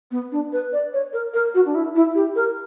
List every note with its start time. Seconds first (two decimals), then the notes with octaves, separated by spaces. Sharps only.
0.11 B3
0.32 D4
0.52 B4
0.72 D5
0.93 C#5
1.13 A#4
1.34 A#4
1.54 F#4
1.66 D4
1.75 E4
1.96 E4
2.15 G4
2.36 A#4